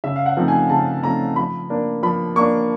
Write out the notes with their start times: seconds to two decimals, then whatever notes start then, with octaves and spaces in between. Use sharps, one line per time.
0.04 C#3 E5
0.16 F5
0.26 F#5
0.37 F3 A3 C4 D#4
0.48 G#5
0.70 C#3 A5
1.03 F3 A3 C4 D#4 A#5
1.36 F3 B5
1.70 A#3 D4
2.03 F3 B5
2.36 A#3 D4 C#6